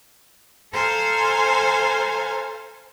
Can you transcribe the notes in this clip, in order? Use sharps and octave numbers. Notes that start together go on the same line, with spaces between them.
A4 C5 F5 G#5 A#5